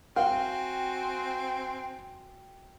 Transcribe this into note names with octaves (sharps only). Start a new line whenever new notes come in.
C4 F#4 F5 G5 G#5